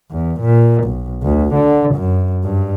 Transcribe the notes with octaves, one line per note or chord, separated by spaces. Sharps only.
E2
A#2
B1
D2
D3
F#2
G2